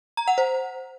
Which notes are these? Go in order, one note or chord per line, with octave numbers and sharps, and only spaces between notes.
A#5
F#5
C5